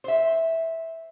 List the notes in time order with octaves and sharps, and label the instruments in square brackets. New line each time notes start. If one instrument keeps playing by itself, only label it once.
[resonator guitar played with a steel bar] C5 E5